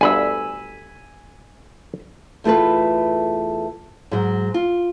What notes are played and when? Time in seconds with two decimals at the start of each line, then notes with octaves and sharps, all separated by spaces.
0.01 G1 D2 G#5 B5 E6
2.44 E2 A3 F4 A4 B4
4.11 G#2 F#3
4.54 F4